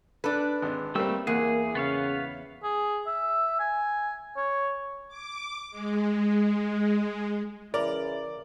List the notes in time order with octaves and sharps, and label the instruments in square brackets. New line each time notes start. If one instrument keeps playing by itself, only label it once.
[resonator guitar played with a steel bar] D4 B4 [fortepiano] A4 D5
[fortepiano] G#1
[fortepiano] G3 A#3 C4 [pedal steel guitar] A3 E6
[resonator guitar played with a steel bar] E2 [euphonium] A#3 [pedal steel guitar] G#4 [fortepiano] F#5
[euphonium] C#3 [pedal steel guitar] B3 C#5 F5
[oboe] G#4
E5
G#5
C#5
[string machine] D6
G#3
[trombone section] C#3 E3 E4 [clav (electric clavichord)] A#4 [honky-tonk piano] D5